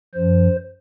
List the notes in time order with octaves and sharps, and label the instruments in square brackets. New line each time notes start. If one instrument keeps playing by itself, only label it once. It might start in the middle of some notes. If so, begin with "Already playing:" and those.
[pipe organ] F#2 F3 C5